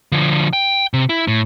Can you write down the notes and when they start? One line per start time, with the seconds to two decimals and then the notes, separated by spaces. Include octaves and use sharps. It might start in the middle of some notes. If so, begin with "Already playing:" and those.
0.12 D3 F3
0.53 G5
0.94 C3
1.09 E4
1.28 A2